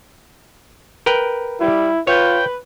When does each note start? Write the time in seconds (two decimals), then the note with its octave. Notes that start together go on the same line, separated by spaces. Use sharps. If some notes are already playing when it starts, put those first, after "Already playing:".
1.06 A#4 B4 G5
1.61 G3 E4
2.07 F4 B4 C#5 G5